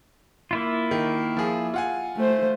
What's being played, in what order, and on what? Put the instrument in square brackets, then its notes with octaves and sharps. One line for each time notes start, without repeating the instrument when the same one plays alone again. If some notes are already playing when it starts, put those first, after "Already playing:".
[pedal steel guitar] A#3 E4 F4
[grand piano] D#3
F3 G#4
F4 F#5 G#5
[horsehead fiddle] A3 C5